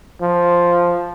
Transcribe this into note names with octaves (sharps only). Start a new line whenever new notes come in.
F3